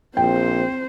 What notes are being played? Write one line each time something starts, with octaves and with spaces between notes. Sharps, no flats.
A#1 C4 C5 G5